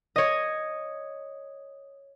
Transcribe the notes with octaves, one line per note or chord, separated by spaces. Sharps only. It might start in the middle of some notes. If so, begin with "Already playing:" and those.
C#5 D#5